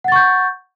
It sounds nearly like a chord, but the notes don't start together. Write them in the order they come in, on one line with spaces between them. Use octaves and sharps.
F#5 A6 C#6 G6